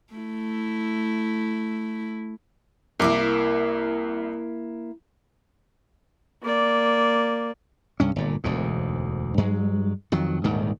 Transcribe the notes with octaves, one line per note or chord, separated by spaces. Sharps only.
A3 E4
C2 A#3 E4 A#4 E5 D6
A#3 D5
C2 G2 C#4
G1 A#2
E1 D2 G#2
G2 F#3 G#3
F2 D#3 F#3
D#1 D2 G#2 D#3